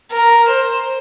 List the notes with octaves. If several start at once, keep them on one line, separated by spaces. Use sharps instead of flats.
A#4
C5